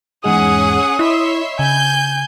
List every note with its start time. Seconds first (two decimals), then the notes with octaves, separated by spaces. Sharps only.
0.24 E2 G#2 G#3 C#4 G#4 F#5 D#6
0.99 E4 C#5 D#5 E5 B5 C6
1.59 C#3 G#5 G6